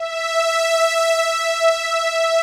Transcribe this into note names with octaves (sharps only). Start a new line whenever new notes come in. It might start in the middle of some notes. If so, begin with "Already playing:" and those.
Already playing: E5
E5